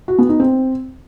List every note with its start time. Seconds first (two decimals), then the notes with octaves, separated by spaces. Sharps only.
0.08 F#4
0.19 B3
0.29 D#4
0.40 C4